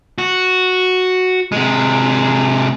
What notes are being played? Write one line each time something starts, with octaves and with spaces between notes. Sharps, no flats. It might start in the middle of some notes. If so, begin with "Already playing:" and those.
F#4
C3 G#3